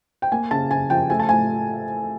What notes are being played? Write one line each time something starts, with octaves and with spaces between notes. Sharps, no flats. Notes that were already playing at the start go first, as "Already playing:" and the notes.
G5
A#3 G#5
C#3 A5
C#3 G#5
F3 G5
A3 G#5
A5
A2 G#5